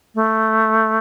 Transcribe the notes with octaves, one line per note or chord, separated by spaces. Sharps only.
A3